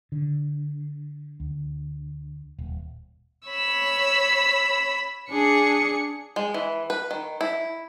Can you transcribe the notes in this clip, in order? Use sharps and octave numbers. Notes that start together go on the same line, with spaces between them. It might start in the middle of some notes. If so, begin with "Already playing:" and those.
D3
D2
D#1
C#5 B5 E6
D4 G#4 C#7
G#3
E3
B4
D#3
E4